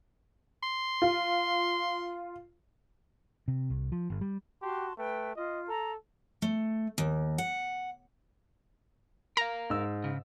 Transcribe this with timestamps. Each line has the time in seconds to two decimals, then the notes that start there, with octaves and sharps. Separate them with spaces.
0.63 C6
1.02 F4
3.48 C3
3.70 C2
3.92 F3
4.10 G1
4.21 G3
4.62 F#4 G4 A5 C6
4.97 A3 B4 G5
5.36 F4 D#5
5.68 A4 A#5
6.42 A3
6.98 D#2
7.38 F#5
9.37 A#4 F5 A#5
9.70 G#2 E6
10.04 C#3